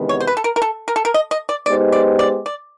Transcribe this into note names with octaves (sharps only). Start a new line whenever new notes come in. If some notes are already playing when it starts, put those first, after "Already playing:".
Already playing: E2 C3 D#3 G#3 B3
C#5
C5
B4
A4
A#4
A#4
A4
A#4
A4
A#4
D#5
D#5
D5
G#3 B3 D#4 G4 C5 D5
D5
D5
D5